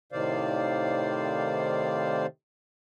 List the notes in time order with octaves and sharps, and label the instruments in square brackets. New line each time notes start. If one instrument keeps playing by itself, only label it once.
[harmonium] A2 C3 D#3 C5 D5 F5